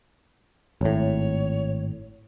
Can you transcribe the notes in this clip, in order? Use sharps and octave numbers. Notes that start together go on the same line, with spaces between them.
G#1 A2 C#5